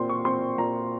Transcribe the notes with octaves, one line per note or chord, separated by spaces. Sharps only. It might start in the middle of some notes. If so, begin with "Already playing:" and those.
Already playing: A#2 C4 C6
C#6
C4 C6
A#2 A#5